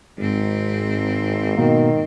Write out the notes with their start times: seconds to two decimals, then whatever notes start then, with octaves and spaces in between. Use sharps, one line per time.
0.18 G#1 G#2 C4
1.57 B2 D#3 A#3